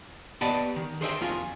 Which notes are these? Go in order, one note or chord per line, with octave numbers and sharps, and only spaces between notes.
B3 G4 D5 D#5 F#5 A5
D#3
G#4 C5 D5 E5 G5
F2 F4 G#4